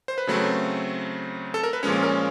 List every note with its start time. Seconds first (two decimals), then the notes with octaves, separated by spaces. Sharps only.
0.08 C5
0.18 B4
0.27 C#3 F#3 A3 C4
1.54 A4
1.63 A#4
1.73 B4
1.83 A#2 F3 G#3 C#4 C#5
2.03 A#4